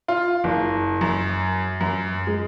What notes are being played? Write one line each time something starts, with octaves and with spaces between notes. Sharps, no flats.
F4
F#1
F#2
F#2
G#3